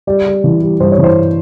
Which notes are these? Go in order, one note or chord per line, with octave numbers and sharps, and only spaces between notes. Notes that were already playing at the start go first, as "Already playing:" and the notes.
G3 D5
G3
E3
G3
G2 C5
C#5
E3
C5